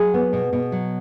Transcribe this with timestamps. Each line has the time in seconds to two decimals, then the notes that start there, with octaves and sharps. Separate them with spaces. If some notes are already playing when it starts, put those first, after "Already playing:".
Already playing: F#3 G#4
0.14 B3
0.33 B2
0.53 B2
0.72 F#3